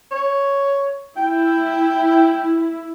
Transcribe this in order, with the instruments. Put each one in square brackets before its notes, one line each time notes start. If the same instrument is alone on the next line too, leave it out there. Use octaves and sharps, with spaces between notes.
[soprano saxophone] C#5
[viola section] E4 [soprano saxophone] G5